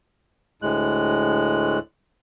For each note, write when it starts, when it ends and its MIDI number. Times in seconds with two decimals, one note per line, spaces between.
0.62 1.79 38
0.62 1.79 45
0.62 1.79 56
0.62 1.79 90